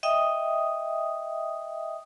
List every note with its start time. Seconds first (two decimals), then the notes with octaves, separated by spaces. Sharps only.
0.03 D#5 E5 G5 D#6